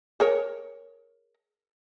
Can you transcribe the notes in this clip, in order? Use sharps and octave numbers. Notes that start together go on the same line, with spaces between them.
G#4 A#4 C#5